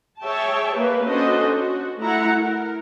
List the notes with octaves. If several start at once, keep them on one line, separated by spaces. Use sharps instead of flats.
G#4 C#5 E5 G5 A5
A#3 B4
C#4 D4 F#4 A4 C5 D#5
F#4
A3 E4 F#5 A#5
A#4